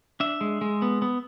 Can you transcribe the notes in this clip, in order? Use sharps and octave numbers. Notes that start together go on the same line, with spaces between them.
D4 E5
G#3
G#3
B3
B3